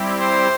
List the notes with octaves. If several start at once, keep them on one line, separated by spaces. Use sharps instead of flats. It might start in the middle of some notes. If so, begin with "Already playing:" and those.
Already playing: G3 C4 E4 G4
C5